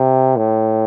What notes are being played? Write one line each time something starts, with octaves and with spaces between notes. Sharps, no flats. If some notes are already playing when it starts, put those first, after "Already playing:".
Already playing: C3
A2